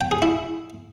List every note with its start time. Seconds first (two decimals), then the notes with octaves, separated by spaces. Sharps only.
0.01 G5
0.11 G#4
0.22 E4